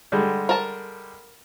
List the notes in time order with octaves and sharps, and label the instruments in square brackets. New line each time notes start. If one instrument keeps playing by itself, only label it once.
[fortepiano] D3 G3 G#3
[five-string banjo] A#4 A5